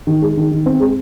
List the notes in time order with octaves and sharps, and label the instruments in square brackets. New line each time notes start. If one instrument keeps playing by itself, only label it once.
[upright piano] D#3
G#3
D#3
D#3
C4
G#3